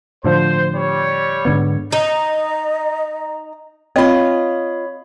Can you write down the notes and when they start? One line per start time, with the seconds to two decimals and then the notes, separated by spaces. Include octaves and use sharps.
0.24 A2 D3 F3 C5
0.75 G3 C#5
1.45 G#2 D3 B3
1.92 D#4 D#5
3.96 C4 F4 C#5 D#5 B5